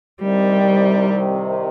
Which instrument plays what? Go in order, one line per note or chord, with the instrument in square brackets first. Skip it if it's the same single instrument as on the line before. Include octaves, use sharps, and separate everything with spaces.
[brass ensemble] C2 C3 D#3 [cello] G3